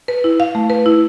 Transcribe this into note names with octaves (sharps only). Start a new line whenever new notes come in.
B4
E4
F5
A3
B4
E4